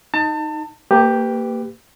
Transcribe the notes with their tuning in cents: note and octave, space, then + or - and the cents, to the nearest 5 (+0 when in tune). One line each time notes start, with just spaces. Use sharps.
D#4 +0 A5 +30
A#3 -25 G4 +5 B4 +15